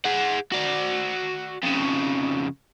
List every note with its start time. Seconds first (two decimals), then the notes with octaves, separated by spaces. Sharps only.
0.05 G#4 F#5
0.52 F#4 D5
1.63 F2 C#3